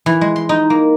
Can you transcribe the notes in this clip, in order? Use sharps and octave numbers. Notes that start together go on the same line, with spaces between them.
E3
G#3
C6
D#4
A#3